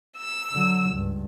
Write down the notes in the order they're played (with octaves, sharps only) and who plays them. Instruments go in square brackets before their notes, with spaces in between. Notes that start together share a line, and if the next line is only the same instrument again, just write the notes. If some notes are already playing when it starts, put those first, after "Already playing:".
[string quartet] E6
[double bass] D3 F#3
C#2 G2